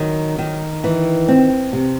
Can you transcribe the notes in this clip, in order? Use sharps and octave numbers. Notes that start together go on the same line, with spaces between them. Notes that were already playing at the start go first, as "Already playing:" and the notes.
Already playing: D#3 F#3
D#3
E3
C4
C3